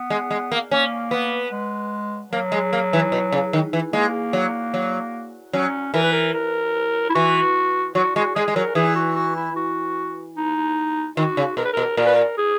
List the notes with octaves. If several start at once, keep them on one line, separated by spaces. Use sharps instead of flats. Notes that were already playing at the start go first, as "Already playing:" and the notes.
Already playing: B3
G#3
G#3
A#3
A#3 C#4
B3
G#3
F#3 A#3
G#3
A#3
E3
B2
C#3
D#3
E3
G#3 A#3
F#3
F#3
F#3 C#4
E3 A#4
B4
A#4
A#4
E4
E3 F#4
F#3 F#4
G#3 F#4
G#3 G#4
G#3
F#3 A#4
E3 G#4
F#4
F#4
E4
F#4
D#4
D#3 F#4
C#3
B2 A#4
B4
B2 A#4
A#2 A#4
B4
A#4
G#4